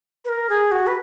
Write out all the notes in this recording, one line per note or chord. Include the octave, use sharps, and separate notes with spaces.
B4
A#4
G#4
F#4
B4